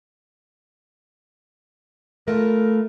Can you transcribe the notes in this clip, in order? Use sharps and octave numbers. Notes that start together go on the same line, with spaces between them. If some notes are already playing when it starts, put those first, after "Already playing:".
A3 F4 A#4 B4